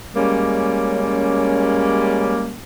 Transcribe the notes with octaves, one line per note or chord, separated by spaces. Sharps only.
G3 G#3 A#3 C#4